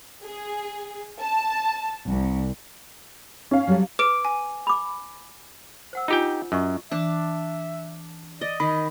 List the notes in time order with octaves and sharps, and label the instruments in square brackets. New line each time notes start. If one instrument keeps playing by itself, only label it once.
[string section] G#4
A5
C2
[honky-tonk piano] C#4 F5
[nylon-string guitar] F#3 G3 A4
[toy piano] B4 [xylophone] D6 D7
[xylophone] G#5
[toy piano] B5 D6
C5 F#5 E6
[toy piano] D4 F4 [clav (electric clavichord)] D#4 G4 G5
[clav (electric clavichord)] F#2 [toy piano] E4 D#5 C#6
[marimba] E3 [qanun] D4 A5 [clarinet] E5
[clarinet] D5 [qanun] D#5
[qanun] D#3 [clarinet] D#5 [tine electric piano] B5